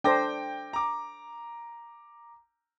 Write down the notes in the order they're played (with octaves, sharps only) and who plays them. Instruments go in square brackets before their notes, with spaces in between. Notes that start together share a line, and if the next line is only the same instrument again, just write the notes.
[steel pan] D4 A4 C5 [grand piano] G5 D6 A#6
[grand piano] A#5 D6